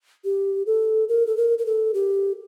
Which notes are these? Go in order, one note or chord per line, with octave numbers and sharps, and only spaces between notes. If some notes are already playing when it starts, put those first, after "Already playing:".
G4
A4
A#4
A4
A#4
A#4
A4
G4